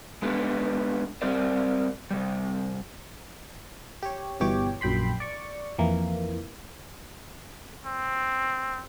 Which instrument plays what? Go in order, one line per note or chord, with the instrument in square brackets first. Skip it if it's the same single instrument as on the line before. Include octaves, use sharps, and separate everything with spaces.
[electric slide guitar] G#3 B3 D4 G4 A4 B4
G3 C4 G4 A#4 C5 D5
C3 G3
[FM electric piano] G4 C#5
G1 B2 E3 G4 C#5 D6
A#1 F#2 G5 B5 C6
D5 C#6
F2 E3 A#3
[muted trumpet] C4